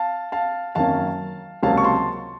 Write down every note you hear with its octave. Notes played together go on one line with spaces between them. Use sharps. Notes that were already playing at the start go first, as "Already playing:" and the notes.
Already playing: F5 A5
F5 A5
F#2 D#3 A#3 C#4 F5 A5
C#2 C3 F#3 A#3 C#4 F5 A5
C#6
A5 C6